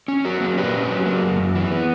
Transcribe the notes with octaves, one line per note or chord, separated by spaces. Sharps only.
C#4
F#3 F#4 A#4
A#3
A#2 G4 B4
C#4
F#3
A#3
F#2
F#2
E3
B3